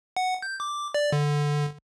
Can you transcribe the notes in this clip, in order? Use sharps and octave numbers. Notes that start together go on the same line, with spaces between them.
F#5
G6
D6
D5
D3